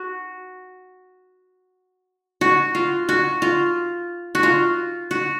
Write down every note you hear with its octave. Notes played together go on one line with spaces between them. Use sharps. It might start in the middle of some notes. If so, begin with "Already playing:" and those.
Already playing: F#4
F#4
F4
F#4
F4
F#4
F4
F#4